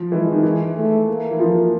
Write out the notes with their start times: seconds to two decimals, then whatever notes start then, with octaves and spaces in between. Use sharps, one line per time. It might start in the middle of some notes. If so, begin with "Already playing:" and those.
Already playing: F3
0.12 E3 G#3
0.32 D#3
0.43 E3
0.76 A3
1.08 A#3
1.31 E3
1.40 F3